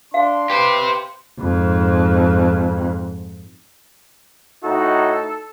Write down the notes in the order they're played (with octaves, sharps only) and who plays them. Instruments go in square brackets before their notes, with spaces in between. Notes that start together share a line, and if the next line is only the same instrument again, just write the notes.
[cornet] D4 [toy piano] F5 [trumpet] C6
[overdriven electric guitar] G4 C5 [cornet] B4
[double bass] F2 G#2
[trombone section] A2 D#4 [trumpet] F#4 [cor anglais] A4